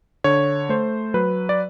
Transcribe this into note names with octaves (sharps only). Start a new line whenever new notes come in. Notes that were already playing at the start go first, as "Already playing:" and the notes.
D3 C#5
A3 C5
F#3 B4
D5